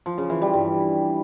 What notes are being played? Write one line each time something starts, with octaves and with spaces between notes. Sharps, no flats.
F3
C#3
E3
G3
G2